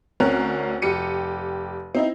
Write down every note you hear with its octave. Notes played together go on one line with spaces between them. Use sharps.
D2 C4 C#4 A#4 F#6
F1 G4 C#7 D#7
C4 D#4 E4